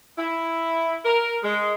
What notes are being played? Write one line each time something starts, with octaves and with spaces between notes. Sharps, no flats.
E4
A#4
G#3